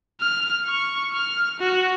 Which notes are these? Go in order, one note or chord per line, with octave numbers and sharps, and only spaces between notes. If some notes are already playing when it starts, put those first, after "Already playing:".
F6
C#6
F6
F#4